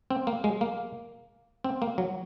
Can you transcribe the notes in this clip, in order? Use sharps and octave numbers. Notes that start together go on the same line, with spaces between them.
C4
A#3
G#3
A#3
C4
A#3
F#3